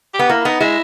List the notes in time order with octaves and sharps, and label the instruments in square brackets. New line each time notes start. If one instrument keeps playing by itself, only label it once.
[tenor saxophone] G4
[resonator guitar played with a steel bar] B3
[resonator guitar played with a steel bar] A#3 [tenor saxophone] E4
[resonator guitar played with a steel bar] B3 [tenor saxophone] D#4
[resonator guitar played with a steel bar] G#3 [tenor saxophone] E4